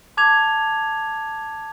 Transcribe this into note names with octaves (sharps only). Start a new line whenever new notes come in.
A5 D6 G#6 F7